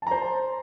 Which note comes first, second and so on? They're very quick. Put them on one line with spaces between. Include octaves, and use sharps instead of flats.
A5 A#5 C5